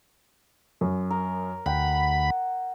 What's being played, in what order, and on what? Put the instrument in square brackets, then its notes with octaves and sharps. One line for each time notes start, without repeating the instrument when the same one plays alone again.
[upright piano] F#2
[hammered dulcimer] A#4
[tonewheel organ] D2 B5 [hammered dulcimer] F#5 [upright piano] G5